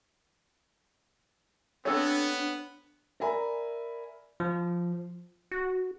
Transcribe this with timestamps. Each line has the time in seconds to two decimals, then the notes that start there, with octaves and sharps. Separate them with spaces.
1.85 B3 C4 D4 A4 C#5
3.20 A#4 D5 E5 G#5 A#5 B5
4.40 F3
5.51 F#4